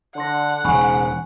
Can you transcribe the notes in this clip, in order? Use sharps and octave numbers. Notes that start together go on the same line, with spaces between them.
D3 D5 F#5 C6 A#6
E1 G#2 C#3 G#5 B5 C#6